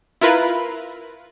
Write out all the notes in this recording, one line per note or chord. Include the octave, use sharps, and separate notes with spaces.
E4 F4 A#4 B4